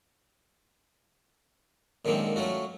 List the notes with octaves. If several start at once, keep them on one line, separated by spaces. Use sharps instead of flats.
F#2 D3 D#3 G#3 A#3 C4
F#3 A3 C#4 F4 F#4